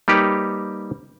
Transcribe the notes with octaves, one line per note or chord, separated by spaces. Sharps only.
G3 A#3 D#4 G4 B4 C#5